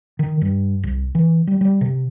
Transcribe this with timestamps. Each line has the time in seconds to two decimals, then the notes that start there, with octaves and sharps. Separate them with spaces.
0.19 D#3
0.41 G2
0.83 C2
1.15 E3
1.47 G3
1.61 G3
1.81 C3